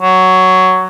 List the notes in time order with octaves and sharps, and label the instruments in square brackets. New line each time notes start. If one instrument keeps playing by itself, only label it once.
[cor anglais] F#3